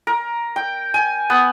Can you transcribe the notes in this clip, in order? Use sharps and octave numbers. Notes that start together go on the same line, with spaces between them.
A#4
G5
G#5
B3